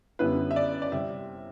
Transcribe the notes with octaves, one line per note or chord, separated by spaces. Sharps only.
F#2 D3 G3 B3 E4 B4
E5
D5
D5
C3 G3 E5